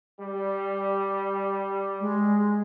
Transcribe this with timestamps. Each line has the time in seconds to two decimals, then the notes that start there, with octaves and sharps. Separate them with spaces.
0.20 G3
2.00 G#3